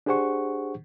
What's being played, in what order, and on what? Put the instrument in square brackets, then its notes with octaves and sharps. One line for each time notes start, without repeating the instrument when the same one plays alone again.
[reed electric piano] D4 G4 G#4 C5 F#5 C#6